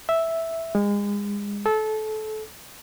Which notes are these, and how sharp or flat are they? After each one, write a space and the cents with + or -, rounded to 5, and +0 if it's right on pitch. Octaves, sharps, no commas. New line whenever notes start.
E5 -5
G#3 -30
A4 -25